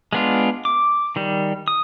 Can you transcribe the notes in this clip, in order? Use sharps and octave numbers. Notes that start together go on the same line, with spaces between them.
G#3 B3 D4 F4
D6
D#3 G3
D#6